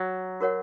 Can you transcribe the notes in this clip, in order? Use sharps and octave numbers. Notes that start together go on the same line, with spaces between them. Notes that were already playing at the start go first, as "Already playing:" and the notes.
Already playing: F#3
F#4 A#4 C#5 F#5